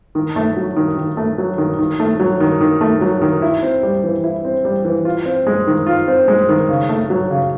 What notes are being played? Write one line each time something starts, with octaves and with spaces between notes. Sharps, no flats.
D#3
A3
F#3
D#3
D#3
A3
F#3
D#3
D#3
A3
F#3
D#3
D#3
A3
F#3
D#3
E4
C4
G3
E3
E4
C4
G3
E3
F4
C4
G#3
D#3
F4
C4
G#3
D#3
C#3
A3
F#3
C#3